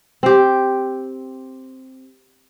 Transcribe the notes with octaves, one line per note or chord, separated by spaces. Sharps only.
C4 G4